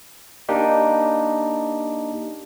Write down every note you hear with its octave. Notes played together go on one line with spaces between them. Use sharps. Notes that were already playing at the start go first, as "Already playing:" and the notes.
A#3 D4 D#4 G4